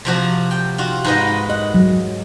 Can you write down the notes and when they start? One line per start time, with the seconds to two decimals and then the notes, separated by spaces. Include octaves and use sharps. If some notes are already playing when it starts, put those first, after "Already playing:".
0.05 C3 F3 F#4
0.51 G5
0.78 F4 F#4
1.04 G#2 B4 D#5
1.50 D#5 F#5
1.74 F#3